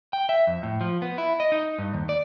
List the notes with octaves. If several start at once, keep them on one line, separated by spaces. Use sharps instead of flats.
G5
E5
F2
A2
F3
B3
E4
D#5
D#4
G2
D#2
D5